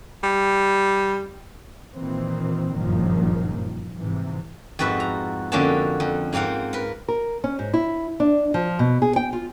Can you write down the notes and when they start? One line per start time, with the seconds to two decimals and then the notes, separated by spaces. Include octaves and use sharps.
0.24 G3
1.95 A#2 D#3 E3 C4
2.75 F#1 G2 A#2 D#3 F3
3.98 G#2 C3 E3
4.79 F2 G#2 F#4 B4 E5
5.00 A#5
5.52 F2 D3 A#3 C#4 F#4 A5
6.00 F2
6.33 G#2 A#3 C4 F5 F#5
6.73 A#4 B4
7.08 A#4
7.44 C#4
7.59 G#2
7.74 E4
8.20 D4
8.54 F3
8.79 B2
9.02 G#4
9.16 G5
9.33 F4